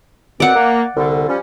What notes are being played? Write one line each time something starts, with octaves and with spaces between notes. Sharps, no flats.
F#2 B2 C4 D5 F#5
A#3
C2 D3
F3 G3 C#4